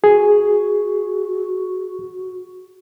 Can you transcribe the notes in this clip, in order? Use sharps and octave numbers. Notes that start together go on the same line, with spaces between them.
F#4 G#4